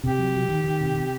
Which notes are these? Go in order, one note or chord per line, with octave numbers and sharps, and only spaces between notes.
C3 G4
F#3
F#3
D#3
D#3
C3
C3